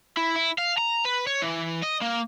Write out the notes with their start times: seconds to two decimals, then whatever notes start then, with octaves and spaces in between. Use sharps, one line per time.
0.17 E4
0.36 E4
0.59 F5
0.78 A#5
1.05 B4
1.27 C#5
1.42 E3
1.82 D#5
2.01 A#3